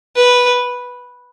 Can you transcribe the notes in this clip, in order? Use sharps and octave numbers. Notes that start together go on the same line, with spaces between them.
B4